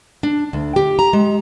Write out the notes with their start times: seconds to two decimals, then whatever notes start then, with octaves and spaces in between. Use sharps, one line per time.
0.23 D4
0.53 D2
0.76 G4
0.99 A#5
1.13 G#3